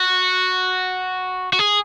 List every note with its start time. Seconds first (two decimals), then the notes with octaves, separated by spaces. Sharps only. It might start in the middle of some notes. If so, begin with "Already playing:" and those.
Already playing: F#4
1.53 F#4
1.59 G#4